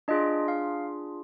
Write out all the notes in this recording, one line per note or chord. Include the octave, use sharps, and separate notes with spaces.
D4 F4 G#4 D#5
F5